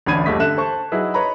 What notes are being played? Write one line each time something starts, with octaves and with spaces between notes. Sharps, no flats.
A1 D2 D4 B5 G#6 D#7
D#1 E2 G2 A3 D#5 B6
D3 A4 E5 F#6 E7
C5 A5 C#6
F#3 D#4 E4 G#4 B4
B4 C#5 D#5 A#5 B5